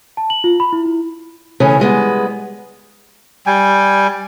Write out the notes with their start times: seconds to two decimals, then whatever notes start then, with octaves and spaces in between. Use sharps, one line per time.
0.17 A5
0.30 F#7
0.44 F4
0.60 B5
0.73 E4
0.85 E4
1.60 C#3 E3 A3 C#4
1.80 G3 G#3 B3
3.46 G3 G5 G#5